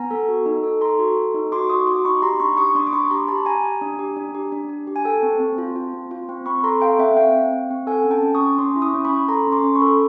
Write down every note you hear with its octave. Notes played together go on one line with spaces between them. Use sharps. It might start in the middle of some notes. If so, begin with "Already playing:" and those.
Already playing: B3 G#5 A#5
A4
F#4
D#4
A4
A4 A#5 C6
F#4
A4
D#4
F#4 C6 D6
F#4 C#6 D#6
F#4 C6 D6
D#4 B5 C#6
G4 A#5 C6
D4 B5 C#6
G4 C#6 D#6
C#6
D4 C6 D6
D6
D4 B5 C#6
G4 A#5 C6
G4 A5 B5
G4 G#5 A#5
G4
D4
G4
D4
G4
D4
D4
G4
G#5
A4 G5 A5
C4
C4
F4
F4
C4
F4
C4
C4 B5 C#6
A4 A#5 C6
A4 F5 G5
C4 E5 F#5
C4 F5 G5
C4
C4
C4
A4 F#5 G#5
C#4
G5 A5
C#4
C#6 D#6
C#4
C#4 C6 D6
E4
C#6 D#6
C#4
B5 C#6
C#4
A4 A#5 C6
C#4
C6 D6
C#4
B5 C#6
A4